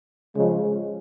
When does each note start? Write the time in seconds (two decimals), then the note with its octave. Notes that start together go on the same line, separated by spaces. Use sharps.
0.35 C#3 F3 G#3